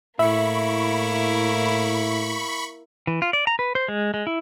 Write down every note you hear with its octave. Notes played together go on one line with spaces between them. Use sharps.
A2 A#3 E4 E5 B5 C#6
E3
F4
D5
A#5
B4
C5
G#3
G#3
E4